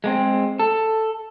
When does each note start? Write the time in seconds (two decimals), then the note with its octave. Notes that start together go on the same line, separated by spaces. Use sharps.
0.04 G#3 A#3 C4
0.60 A4